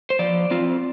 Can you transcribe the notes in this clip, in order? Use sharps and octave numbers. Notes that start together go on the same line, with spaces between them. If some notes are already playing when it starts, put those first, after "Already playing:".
C5
F3 D5
C4 F4